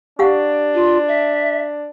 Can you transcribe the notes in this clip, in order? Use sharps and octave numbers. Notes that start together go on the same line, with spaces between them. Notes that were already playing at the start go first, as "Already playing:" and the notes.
D4 G4 F5 F#5
F4
E5